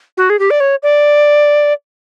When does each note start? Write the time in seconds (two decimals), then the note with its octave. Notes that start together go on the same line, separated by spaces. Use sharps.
0.17 F#4
0.30 G#4
0.39 G4
0.50 D5
0.60 C#5
0.83 D5